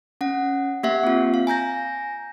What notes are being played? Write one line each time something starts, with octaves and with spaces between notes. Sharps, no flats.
C#4 F#5
A#3 G4 E5 F#5
C4 F4
F5
G#5 A#5 G6 A#6